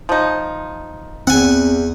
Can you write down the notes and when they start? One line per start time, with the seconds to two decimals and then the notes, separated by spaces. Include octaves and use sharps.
0.09 F3 D#4
1.27 E2 C4 F#5 G#5